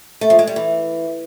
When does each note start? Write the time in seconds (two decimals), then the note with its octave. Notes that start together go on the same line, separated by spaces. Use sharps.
0.21 A3
0.30 F3
0.39 G#3
0.47 G3
0.56 E3